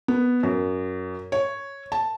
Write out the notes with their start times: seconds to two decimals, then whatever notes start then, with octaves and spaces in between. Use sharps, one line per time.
0.08 B3
0.43 F#2
1.32 C#5
1.92 A5